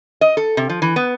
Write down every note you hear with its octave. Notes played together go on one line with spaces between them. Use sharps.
D#5
A4
C3
F3
E3
B3